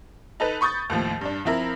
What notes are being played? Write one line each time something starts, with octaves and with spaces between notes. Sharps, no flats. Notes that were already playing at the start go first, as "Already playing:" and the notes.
D#4 A4 B4
B5 C#6 D#6 G6 A6
D#2 A2 F3
G2 D4
F3 C4 E4 A#4